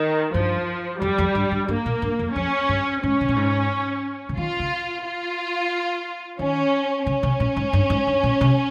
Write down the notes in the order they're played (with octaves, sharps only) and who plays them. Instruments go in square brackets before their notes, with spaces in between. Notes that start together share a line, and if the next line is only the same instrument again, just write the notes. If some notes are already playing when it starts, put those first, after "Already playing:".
Already playing: [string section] D#3
[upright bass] G2 [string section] F3
[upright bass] F2 [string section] G3
[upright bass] F2
G2
G2
[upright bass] G2 [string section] A#3
[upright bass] A#2
G2
F2
[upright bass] F2 [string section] C#4
[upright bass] G2
[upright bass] G#2 [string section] C#4
[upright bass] C3
A#2
G#2
C#3
[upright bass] D#3 [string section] F4
[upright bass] C#3
[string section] F4
[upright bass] D#3 [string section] C#4
[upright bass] C#3 [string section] C#4
[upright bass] C3
A#2
G#2
G2
G#2
G2
A#2
C3